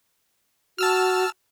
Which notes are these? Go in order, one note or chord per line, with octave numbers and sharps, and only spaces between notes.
F#4 A5 E6 F6